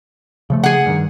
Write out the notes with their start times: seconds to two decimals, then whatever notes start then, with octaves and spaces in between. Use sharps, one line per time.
0.50 C#3 F3 A3
0.64 G#4 F#5
0.86 G2 D#3